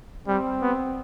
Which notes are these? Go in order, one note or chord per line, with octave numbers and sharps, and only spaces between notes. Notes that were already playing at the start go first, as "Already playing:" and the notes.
G3 C4
B3